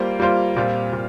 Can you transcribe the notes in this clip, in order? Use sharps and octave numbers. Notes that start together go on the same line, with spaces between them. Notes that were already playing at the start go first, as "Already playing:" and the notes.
Already playing: G3 A#3 F4 C5
G3 A#3 F4 C5
A#2 G3 C4 F4
A#2 G3